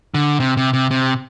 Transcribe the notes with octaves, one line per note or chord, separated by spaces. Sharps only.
D3
C3
C3
C3
C3